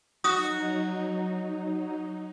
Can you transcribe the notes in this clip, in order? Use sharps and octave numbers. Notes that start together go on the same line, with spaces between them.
F#3 D#4 F#4 D#6